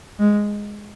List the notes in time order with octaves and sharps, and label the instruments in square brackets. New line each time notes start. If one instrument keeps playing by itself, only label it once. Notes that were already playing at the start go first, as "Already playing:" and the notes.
[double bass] G#3